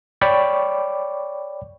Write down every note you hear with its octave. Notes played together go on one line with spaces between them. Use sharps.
C#5 D5 G5 B5 C#6 D6